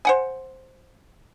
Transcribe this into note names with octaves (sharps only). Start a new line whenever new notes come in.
C5 F#5 G#5